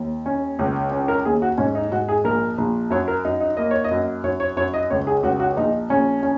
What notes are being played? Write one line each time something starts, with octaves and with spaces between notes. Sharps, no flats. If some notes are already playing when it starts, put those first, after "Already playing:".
Already playing: D#2
C#4
C#2
C#4
A#4
D#2 G#4
F#4
G#2 C#4
D#4
G#2 F#4
G#4
A#1 A#4
A#1
F#2 C#5
A#4
F#2 D#4
D#4
A#3 D#5
C#5
D#5
F#2
F#2 C#5
C#5
F#2 C#5
D#5
C#2 C#5
G#4
C#2 F#4
F#4
A#1 D#4
A#1 C#4
C#4